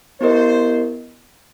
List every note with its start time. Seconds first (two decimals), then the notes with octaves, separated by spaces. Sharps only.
0.21 B3 E4 G4 A#4 C5 D#5